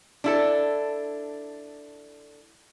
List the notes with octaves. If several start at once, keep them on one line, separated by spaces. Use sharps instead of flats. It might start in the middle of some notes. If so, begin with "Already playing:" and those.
D4 E4 A4